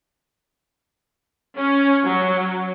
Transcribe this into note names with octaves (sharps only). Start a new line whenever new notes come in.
C#4
F#3